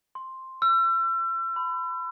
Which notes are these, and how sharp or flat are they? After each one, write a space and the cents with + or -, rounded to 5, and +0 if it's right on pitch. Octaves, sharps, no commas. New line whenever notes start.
C6 +5
E6 +40
B5 +30